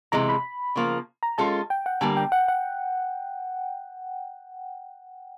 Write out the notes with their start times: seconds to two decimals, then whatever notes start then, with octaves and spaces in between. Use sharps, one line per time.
0.12 C3 E3 G#3 A#5
0.29 B5
0.76 C#3 F3 A#3
1.23 A#5
1.38 G#3 C#4 F4 A4 A5
1.70 G5
1.86 F#5
2.01 D3 G3 A#3 G#5
2.17 G5
2.32 F#5
2.48 F#5